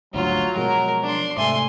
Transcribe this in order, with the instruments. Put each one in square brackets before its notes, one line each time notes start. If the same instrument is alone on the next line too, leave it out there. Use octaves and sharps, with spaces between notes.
[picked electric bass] G#1 D2 G2 [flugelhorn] F#3 [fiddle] F4
[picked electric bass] B2 F3 G#3 [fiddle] A#4
[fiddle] D4 C6
[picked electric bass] G#2 C3 A3 [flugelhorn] E5 [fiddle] G#5 C6